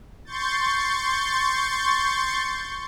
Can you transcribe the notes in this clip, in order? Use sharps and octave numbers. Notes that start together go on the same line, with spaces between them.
C6 C#6 G6 A6